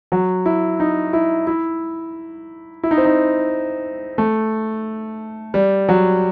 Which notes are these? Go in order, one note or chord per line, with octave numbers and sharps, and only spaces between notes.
F#3
E4
D#4
E4
E4
E4
D#4
C4
D#4
A3
G3
F#3